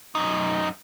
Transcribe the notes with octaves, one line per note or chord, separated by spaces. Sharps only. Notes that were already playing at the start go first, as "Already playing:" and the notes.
F#2 D#4